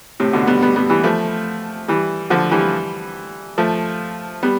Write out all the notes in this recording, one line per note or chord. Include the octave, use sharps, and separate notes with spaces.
A2 C3
B2 D3
G3 B3
G3 B3
G3 B3
E3 G3
F3 A3
E3 G3
D3 F3
E3 G3
F3 A3
G3 B3